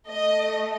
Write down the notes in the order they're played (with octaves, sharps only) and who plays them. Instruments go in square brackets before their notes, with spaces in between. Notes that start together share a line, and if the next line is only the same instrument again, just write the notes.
[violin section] A3 D#5